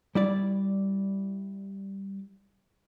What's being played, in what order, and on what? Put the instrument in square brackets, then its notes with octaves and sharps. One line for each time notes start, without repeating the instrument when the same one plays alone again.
[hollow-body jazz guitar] G3 E4 D5